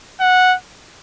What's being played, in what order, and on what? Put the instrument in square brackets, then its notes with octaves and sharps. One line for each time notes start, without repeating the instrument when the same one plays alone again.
[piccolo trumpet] F#5